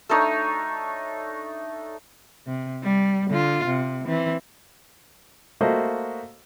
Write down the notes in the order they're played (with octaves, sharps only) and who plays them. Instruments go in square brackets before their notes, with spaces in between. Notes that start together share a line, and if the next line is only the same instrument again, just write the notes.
[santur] A3 D4 D#4 C#5
[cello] C3
G3
D3 F4
C3
E3 C4
[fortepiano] A3 A#3 F#4 C5 D#5